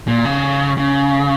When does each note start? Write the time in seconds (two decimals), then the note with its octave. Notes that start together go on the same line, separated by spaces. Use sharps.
0.08 A#2
0.25 C#3
0.78 C#3